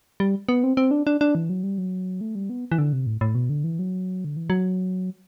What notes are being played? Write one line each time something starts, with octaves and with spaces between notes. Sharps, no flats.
G3
B3
C4
C4
D4
D4
D4
E3
F#3
G3
F#3
A3
G3
B3
E3
D3
C3
A2
A2
B2
D3
E3
F#3
D3
E3
F#3